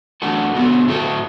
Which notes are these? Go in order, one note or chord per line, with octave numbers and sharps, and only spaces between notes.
E3 A3 D4 F#4 A4
D3 B3 F#4 A4
A2 A3 F#4 A4